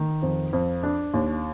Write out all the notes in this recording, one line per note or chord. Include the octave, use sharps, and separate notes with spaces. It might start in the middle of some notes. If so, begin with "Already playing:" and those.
Already playing: D#3
F2
F2
D4
D#2